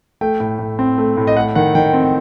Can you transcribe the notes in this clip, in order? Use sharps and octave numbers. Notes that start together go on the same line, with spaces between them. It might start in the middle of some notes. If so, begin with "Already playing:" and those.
A3 G5
A2
A2
C4
A3
A2
D#5
A3 F#5
D#3 F#5
D#3 G5
C4